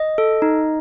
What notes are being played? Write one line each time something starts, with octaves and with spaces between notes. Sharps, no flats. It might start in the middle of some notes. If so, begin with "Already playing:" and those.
Already playing: D#5
A4
D#4